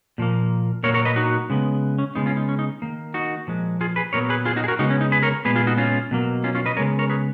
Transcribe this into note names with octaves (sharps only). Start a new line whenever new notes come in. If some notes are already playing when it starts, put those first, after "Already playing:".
A#2 F3 A#3
A#2 F#3 A#3 A#4 C#5
A#4 C#5
B4 D#5
D#4 F#4
C#3 G#3 B3
C#4
C#3 G#3 B3 D#4
C#4 F4
D#4
C#4
D#4
D#3 A#3
D#4 F#4
A#2 F3 G#3
F4 G#4
G#4 B4
A#2 F#3 B3 A#4 C#5
G#4 B4
F4 G#4
D#4 F#4
G#4
F#4 A#4
C#3 G#3 B3 D#4 F#4
C#4
D#4
G#4 B4
A#4 C#5
A#2 G#3 B3 G#4 B4
F4 G#4
D#4 F#4
C#4 F4
B2 F#3 A#3
C#4 F4
C#4 F4
B4 D#5
C#3 G#3 B3 A#4 C#5
A#4 C#5
G#4 B4